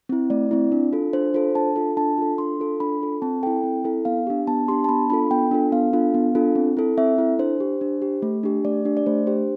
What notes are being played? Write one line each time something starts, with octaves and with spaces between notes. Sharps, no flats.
C4 E4
A3 D5
C4 E4
D4
F4 A4
D4 C5
F4 A4 C5
D4 A5
F4 A4
D4 A5
F4 A4
D4 C6
F4 A4
D4 B5
F4 A4
C4 A5
E4 A4 G5
C4
E4 A4
B3 F5
D4 G4
B3 A5
D4 G4 C6
A5
B3 B5
D4 F4 A4 B5
B3 G5
D4 F4 A4
B3 F5
D4 F4 A4
B3
D4 F4 A4
C4
E4 A4
C4 E5
E4 A4
D4 C5
G4
D4
G4
A3
D4 G4
A3 D5
D4 G4
D5
A3 C5
D4 G4 C5